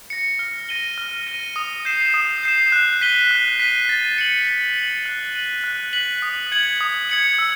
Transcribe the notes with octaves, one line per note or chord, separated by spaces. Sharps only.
A#6 C#7
F6
A#6 D#7 G7
F6
A#6 D#7 G7
D#6
G6 C7 E7
D#6
G6 C7 E7
F#6
B6 D#7 G7
F#6
B6 D#7 G7
A6
C#7 F#7
A6
C#7 F#7
F#6
B6 D#7 F#7
F#6
B6 D#7 F#7
D#6
G#6 C#7 F#7
D#6
G#6 C#7 F#7
E6